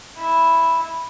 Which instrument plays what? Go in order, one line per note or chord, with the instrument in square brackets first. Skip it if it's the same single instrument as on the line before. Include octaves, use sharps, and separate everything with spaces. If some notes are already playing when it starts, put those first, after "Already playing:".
[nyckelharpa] E4